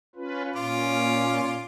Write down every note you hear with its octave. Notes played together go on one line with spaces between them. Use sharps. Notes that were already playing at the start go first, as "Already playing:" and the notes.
C#4 F4 B4
A#2 C#4 F4 D6